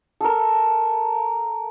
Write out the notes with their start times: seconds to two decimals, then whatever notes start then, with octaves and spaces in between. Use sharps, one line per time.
0.21 A4 A#4